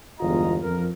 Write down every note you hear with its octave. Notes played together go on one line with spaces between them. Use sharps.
G1 E2 G#3 F4 D#5 A#5
F2 A#4